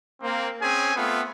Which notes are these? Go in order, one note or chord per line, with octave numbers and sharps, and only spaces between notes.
A#3 C4
C4 C#4 G#4 G#5
A3 B3 C4 F4